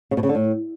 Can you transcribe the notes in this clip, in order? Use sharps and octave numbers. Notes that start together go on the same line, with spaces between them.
C#3
B2
C#3
D3
A2